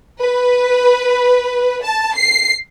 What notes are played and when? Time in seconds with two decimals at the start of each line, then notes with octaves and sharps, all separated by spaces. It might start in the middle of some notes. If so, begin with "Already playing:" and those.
0.20 B4
1.83 A5
2.16 C7